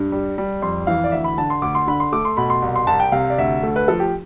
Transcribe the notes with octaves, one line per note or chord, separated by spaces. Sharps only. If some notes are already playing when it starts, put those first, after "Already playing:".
Already playing: G2
G3
G3
F2 C6
E3 F5
D5
D2 E5
B5
D3 A5
C6
D2 D6
C6
D3 B5
C6
A3 D6
C6
B2 B5
C6
C2
C6
C2 A5
G5
C3 F5
D5
D2 E5
A3
B4
F3 A4
G4